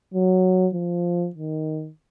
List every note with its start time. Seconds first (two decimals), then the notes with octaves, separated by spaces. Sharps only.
0.14 F#3
0.74 F3
1.35 D#3